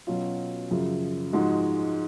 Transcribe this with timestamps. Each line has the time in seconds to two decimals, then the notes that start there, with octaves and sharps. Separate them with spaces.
0.07 B2 F#3 C#4 F4
0.71 F#2 C#3 F3
1.33 G#2 F3 G#3 D#4 F#4